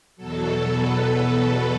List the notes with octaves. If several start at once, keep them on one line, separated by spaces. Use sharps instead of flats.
E2 B2 F#3 A4
B4